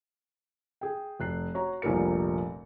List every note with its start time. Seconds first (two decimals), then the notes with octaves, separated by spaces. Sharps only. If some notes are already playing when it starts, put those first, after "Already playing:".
0.81 G#4 G5
1.20 F1 F#6 C7
1.54 F#4 C#5 A#5
1.82 F1 A#1 A#2 G3 A#4 C#7